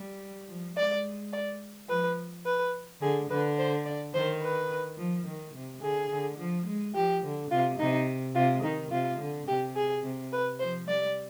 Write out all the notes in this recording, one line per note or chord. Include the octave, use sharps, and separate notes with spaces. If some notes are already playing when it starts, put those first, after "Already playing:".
Already playing: G3
F3
G#3 D5
D5
F3 B4
B4
D3 G#4
D3 B4
C5
D5
D#3 C5
B4
F3
D#3
C3
D3 G#4
D3
F3
G#3
F3 G4
D3
C3 F4
C3 D#4
C3 F4
D#3 D#4
C3 F4
D3
C3 G4
G#4
C3
B4
F3 C5
G3 D5